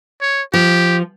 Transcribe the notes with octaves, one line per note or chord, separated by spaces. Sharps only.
C#5
F3 G4